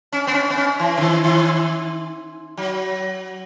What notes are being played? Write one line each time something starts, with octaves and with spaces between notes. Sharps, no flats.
C#4
B3
C#4
B3
C#4
E3
C#3
D#3
D#3
F#3